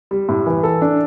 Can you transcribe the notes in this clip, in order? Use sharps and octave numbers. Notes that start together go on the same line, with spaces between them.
G3
A2
E3
A4
D4